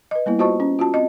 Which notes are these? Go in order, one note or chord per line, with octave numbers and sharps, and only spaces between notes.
B4 D#5
G3 A#3 B3 E4
F4 F#4 C5 D#5 A5 C#6
C#4
F4 F#4 A5
C4 D#5